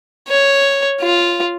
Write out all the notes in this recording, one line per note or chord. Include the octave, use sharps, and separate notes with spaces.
C#5
F4